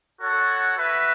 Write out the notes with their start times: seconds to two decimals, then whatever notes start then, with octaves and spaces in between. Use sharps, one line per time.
0.21 F#4 A4 C#5 F#5
0.77 F#4 B4 E5